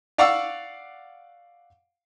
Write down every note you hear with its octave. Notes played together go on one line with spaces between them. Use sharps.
D5 F5 F#5 C#6 D6 E6